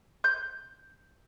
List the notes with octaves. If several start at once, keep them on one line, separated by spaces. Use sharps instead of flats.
G6